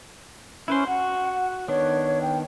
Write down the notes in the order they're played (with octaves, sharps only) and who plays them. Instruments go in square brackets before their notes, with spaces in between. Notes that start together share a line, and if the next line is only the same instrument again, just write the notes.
[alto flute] C#4 [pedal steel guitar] E4 B4 C5
[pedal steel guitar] F#4 [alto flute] F#5
[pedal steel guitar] D#3 B3 D4 [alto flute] C#5
[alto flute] G5